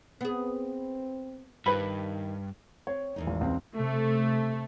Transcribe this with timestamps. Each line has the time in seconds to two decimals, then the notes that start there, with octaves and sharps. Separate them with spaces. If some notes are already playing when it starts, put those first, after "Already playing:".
0.21 B3 C4 G#4
1.66 G2 D#3 B4 B5
2.87 C4 C#5
3.16 E2 G2 D#4
3.27 G#1
3.41 C#2 C4
3.77 C3 A3